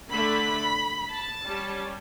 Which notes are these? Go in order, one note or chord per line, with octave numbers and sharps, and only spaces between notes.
D3 A3 D4 B5
A5
G3 C#4